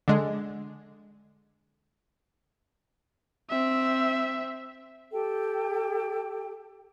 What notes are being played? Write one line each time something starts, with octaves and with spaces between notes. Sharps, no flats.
D3 G#3
C4 E5
G4 A4 G5